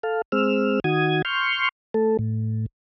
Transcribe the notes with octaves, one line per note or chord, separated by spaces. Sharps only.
A4 F5
G#3 C4 E6 F6
D#3 F#4 D#6 G#6
C6 C#6 F6 G6
A3 A4
A2